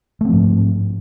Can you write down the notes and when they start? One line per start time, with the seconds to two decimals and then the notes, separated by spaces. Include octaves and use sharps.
0.21 A3
0.25 C4
0.29 F3
0.33 G#2